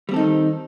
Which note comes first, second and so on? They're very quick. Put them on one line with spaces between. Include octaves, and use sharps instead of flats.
G3 C4 A4 D#4 D#3